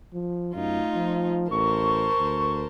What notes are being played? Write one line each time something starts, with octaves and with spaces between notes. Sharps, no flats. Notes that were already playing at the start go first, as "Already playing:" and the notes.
F3
F#2 A3 D#4 F4
F3
A1 A#4 C5 A5 C#6
D2